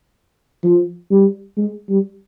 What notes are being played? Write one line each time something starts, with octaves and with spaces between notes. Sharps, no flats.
F3
G3
G#3
G3